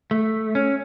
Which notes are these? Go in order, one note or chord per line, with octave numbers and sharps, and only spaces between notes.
A3
C#4